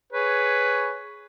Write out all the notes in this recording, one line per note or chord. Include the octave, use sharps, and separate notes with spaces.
G#4 B4 C#5